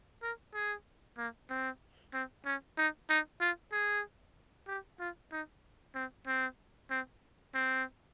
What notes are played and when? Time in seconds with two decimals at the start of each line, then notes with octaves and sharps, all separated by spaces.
0.22 A#4
0.54 G#4
1.18 A#3
1.50 C4
2.14 C4
2.45 C#4
2.78 D#4
3.09 D#4
3.40 F4
3.72 G#4
4.68 G4
5.00 F4
5.32 D#4
5.95 C4
6.27 C4
6.90 C4
7.54 C4